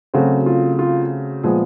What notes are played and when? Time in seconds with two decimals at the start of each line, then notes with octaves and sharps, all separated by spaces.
0.14 C#3 F#3 A3 C4 F#4
0.46 F4
0.79 F4
1.43 A#2 F3 G#3 B3 G#4